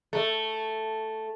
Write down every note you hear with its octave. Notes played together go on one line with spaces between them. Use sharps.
A3